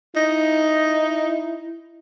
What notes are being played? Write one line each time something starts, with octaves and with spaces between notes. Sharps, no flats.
D#4 E4